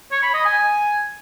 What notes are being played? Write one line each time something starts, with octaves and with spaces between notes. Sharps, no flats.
C#5
B5
D#5
G#5